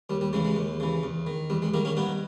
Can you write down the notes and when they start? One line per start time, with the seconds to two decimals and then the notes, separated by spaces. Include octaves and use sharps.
0.10 D#2 G3
0.21 G3
0.33 C#3 E3 G#3
0.45 G#3
0.57 D#2
0.80 C#3 E3
1.03 E2
1.27 D#3
1.50 E2 G3
1.62 G#3
1.74 D#3 G3 A#3
1.85 A#3 C#4
1.97 G2 B3 D#4